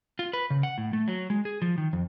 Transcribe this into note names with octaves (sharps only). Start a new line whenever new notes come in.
F4
B4
C#3
F#5
A2
A3
F#3
G#3
G#4
F3
D#3
F2